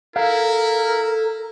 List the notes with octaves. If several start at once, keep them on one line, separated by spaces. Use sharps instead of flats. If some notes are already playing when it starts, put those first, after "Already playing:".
E4 A4 A#4 F5